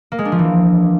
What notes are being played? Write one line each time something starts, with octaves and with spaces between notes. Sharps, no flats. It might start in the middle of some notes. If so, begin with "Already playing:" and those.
A#3
G#3
D4
F3
E3